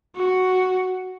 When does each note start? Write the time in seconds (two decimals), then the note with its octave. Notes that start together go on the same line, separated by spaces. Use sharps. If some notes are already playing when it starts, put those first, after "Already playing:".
0.16 F#4